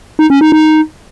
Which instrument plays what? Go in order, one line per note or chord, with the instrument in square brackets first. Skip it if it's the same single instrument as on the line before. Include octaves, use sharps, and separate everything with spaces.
[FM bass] D#4
C#4
D#4
D#4